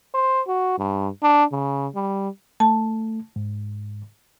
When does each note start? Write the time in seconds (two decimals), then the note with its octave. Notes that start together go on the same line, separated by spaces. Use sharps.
0.14 C5
0.48 F#4
0.78 G2
1.23 D4
1.52 C#3
1.95 G3
2.60 A3 A5
3.36 G#2